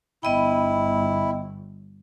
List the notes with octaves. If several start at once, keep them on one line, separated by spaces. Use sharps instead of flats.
G1 B3 E4 D#5 G5